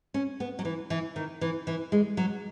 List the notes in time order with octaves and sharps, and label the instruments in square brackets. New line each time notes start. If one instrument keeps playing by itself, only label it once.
[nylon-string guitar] C#4
B3
F#3
E3
E3
D#3
E3
E3
G#3
F#3